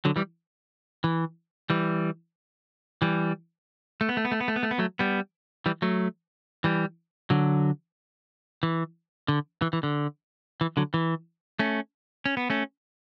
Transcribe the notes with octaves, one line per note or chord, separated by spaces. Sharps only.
D3 F#3
E3 G3
E3
E3 G3
E3 G3
A3
B3
A3
B3
A3
B3
A3
B3
A3
B3
F#3 A3
G3 B3
E3 G3
F#3 A3
E3 G3
D3 F#3
E3
D3
E3
E3
D3
E3
D3 F#3
E3
A3 C#4
C#4
B3
A3 C#4